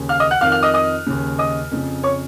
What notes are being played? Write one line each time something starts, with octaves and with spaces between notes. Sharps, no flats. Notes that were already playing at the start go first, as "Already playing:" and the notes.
Already playing: D#2 C#3
F5 F6
D#5 D#6
F#5 F#6
F2 D#3 F5 F6
F5 F6
D#5 D#6
D#5 D#6
D#2 C#3
D#5 D#6
F2 C#3
C#5 C#6